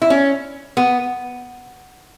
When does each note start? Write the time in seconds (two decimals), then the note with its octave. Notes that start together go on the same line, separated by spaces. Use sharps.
0.02 E4
0.10 C#4
0.77 B3